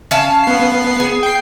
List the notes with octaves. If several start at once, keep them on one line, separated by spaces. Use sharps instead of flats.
C#4 F5 A5
B3 C7
G#4
G5 C7